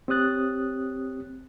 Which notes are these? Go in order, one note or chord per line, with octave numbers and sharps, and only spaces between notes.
C4 G4 C#5 D#6 F#6 A6